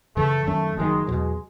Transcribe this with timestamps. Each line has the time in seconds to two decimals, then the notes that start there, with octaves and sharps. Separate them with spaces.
0.16 F#2 C#3 E3 A3
0.46 F#2 D#3 F#3 A3 C#4
0.77 F#1 F#2 D#3 F#3 G#3
1.07 E2 B2 F#3 G#3